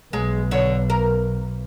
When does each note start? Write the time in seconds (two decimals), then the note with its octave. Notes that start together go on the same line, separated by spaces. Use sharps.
0.13 B1 G#3
0.51 D3 C#5
0.90 A#4